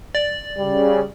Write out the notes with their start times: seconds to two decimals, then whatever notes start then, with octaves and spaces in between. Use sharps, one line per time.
0.15 D5
0.58 C#3 G3